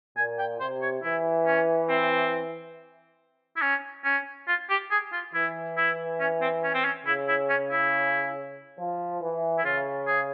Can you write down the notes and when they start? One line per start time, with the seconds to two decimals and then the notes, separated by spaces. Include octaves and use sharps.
0.16 A#2 G#5
0.38 G5
0.59 C3 C5
0.82 C#5
1.03 E3 E4
1.46 C#4
1.89 C4
3.56 E4
3.62 C#4
4.04 C#4
4.48 F4
4.70 G4
4.91 G#4
5.13 F4
5.34 E3 E4
5.77 E4
6.20 C#4
6.41 C4
6.64 C#4
6.74 C4
6.84 C#4
7.06 C#3 E4
7.28 E4
7.49 C#4
7.71 E4
8.79 F3
9.21 E3
9.58 E4
9.65 C#3 F4
10.07 G#4